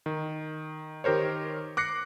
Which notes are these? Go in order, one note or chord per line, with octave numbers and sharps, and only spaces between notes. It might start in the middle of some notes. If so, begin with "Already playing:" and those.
D#3
D#3 G4 A#4 C5 C#5
D6 F#6 A#6 C7 C#7